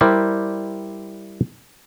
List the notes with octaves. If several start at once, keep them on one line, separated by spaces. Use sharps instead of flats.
G3 E4 G4 A#4 C5 D5